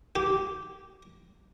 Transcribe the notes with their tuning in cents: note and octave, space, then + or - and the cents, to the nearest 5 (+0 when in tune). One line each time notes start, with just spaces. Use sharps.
G4 -10